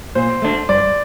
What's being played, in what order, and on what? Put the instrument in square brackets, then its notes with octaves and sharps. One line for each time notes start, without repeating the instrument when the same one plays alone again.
[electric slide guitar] A#2 [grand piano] C5
[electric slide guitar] A3 D4
[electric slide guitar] G2 [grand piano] D5